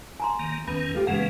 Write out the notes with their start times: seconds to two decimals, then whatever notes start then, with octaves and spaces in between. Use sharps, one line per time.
0.20 G#5 A#5 C6
0.39 D#3 A#3
0.68 E2 D#3 B3 C#4 B5
0.94 A3 F4 G4
1.07 C#3 E3 G#3 A#3 B3 F#5